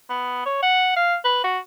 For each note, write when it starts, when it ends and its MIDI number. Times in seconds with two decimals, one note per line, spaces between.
0.09 0.44 59
0.46 0.61 73
0.62 0.94 78
0.96 1.16 77
1.25 1.43 71
1.44 1.58 66